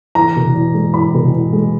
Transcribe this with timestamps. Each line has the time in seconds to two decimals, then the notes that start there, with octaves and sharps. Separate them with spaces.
0.15 E2 A#5
0.36 B2
0.55 E2
0.74 G#3
0.94 E2 B5
1.14 B2
1.34 E2
1.53 G#3